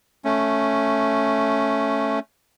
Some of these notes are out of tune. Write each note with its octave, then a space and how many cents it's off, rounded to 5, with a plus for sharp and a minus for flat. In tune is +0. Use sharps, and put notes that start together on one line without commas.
A3 +0 C#4 +0